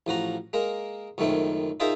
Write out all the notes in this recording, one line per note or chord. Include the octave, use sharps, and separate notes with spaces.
A1 F3 F#4 A#5
G#3 A#3 A#4
C#2 F#2 D#3 A3 C4
D#4 F4 G#4 A#4 C5 E5